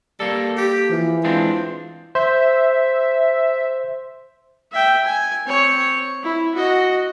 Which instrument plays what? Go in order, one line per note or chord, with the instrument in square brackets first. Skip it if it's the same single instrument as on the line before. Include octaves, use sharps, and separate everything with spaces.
[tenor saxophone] G3 [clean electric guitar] A#3 A4
[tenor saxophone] G4
[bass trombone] E3 [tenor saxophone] F3
[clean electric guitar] G#3 C4 D4 [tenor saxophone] F4
[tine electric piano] C5 [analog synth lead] E5
[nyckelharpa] E5 G5
G#5
C4 C#5
E4
F#4 D#5